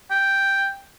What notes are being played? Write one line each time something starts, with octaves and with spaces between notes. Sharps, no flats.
G5